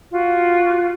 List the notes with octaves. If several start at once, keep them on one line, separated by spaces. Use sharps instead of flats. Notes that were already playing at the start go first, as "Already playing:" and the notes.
F4 F#4